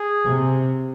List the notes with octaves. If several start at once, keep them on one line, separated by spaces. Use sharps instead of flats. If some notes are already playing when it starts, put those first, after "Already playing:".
Already playing: G#4
C3